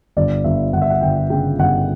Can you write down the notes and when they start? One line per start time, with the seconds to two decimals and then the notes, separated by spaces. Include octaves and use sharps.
0.17 G1 D5
0.44 G1 E5
0.73 G1 F#5
0.82 E5
0.90 F#5
1.01 G1 G5
1.30 C#3 G5
1.58 G1 F#5